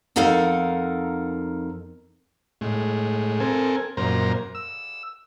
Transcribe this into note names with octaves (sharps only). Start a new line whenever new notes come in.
F2 D#4 A4 A#4 F5 F#5
A2 G#3
C4 A4 A#4 G#5
F#2 A#2 A#4 C5 A#5
E6